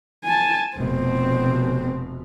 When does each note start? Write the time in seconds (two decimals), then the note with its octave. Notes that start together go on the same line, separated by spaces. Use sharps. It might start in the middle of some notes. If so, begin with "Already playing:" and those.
0.24 G#5 A5
0.77 F1 B2 C4